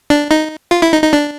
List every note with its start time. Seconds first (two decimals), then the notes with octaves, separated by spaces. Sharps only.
0.10 D4
0.31 D#4
0.71 F4
0.82 E4
0.92 D#4
1.03 D#4
1.13 D4